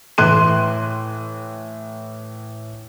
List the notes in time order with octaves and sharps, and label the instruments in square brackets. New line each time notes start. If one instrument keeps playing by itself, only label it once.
[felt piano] A2 E3 C6 F#6 D#7